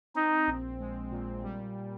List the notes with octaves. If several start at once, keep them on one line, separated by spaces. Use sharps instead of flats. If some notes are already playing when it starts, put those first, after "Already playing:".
C4 D#4
A#1
G#3
A#2
G3